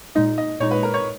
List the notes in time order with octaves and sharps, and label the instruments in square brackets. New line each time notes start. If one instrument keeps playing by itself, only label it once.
[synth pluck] A#2 G#3 D#4 [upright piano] D#5
[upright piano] D#5
[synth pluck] A#2 G#3 D#4 [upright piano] C#5
[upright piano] B4
A#4
C#5